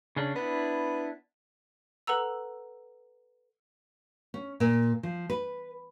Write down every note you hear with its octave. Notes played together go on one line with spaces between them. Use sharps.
C#3 C#4 D4
B3 D4 E4
A4 B4 F#5 A#5 E6
C#4
A#2
F3
B4